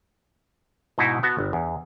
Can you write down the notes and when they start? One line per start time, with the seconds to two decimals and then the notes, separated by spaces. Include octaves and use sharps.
0.98 G#2 B2 D#4 E4
1.23 B3 F#4 A5
1.39 G1
1.53 E2